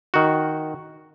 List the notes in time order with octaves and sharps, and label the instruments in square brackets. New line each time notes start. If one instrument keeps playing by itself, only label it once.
[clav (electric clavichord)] D#3 F#4